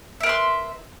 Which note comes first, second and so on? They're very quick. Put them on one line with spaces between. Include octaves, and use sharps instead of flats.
E5 A#4 B4 C6